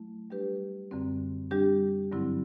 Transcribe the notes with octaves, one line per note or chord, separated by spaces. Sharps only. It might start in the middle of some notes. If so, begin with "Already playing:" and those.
Already playing: F#3 A3 E4
G3 D4 G4 B4
F#2 D3 G3 C4
G3 D4 G4
G2 D3 F#3 C4 E4